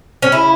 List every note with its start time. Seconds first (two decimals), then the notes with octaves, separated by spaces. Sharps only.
0.22 C#4
0.32 C#3 E4